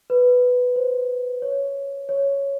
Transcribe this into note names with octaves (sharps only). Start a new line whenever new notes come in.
B4
C5
C#5
C#5